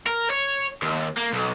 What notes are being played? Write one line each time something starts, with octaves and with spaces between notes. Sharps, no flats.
A#4
C#5
D#2
A#3
B1